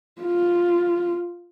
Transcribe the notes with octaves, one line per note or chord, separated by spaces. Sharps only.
F4